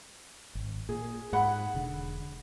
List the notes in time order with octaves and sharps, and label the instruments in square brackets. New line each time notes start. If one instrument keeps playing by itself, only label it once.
[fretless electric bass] G#1
[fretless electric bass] A#2 [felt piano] G#4
[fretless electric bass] G#2 [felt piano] G#4 F#5 B5
[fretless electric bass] E1 D3